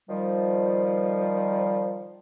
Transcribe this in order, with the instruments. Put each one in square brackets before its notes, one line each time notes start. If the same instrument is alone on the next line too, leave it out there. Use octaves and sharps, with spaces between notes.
[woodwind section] D#3 F3 G3